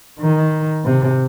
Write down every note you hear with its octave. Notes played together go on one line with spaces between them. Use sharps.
D#3
C3